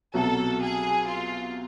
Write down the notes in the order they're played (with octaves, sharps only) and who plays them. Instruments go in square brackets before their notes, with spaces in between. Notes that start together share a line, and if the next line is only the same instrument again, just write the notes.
[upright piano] C2 B2 F#3 [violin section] A4
[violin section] G#4
F4